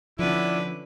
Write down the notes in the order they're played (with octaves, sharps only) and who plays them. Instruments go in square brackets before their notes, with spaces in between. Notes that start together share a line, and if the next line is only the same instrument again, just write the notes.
[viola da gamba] D3 C#4 B4 [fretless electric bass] F3 [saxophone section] B3 D4 E4